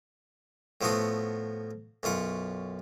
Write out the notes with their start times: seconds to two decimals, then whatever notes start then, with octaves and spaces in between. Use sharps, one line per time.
0.81 A2 F3 A3 B3 F#4 D#6
2.03 B1 F#2 F4 F#5